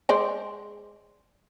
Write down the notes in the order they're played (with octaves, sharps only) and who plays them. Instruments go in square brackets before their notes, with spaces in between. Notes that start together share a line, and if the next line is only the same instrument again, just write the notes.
[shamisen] G#3 C5 D5